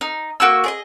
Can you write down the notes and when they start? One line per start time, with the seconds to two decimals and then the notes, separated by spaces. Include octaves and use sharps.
0.01 D#4
0.40 A#3 F#4 C#6 E6
0.64 G#4 D5 D#5